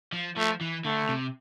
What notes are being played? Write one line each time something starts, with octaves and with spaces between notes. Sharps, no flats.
F3
F3 A3
E3
D3 A3
C3